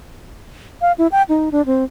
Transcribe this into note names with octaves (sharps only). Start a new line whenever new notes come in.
F5
E4
G5
D#4
D4
C4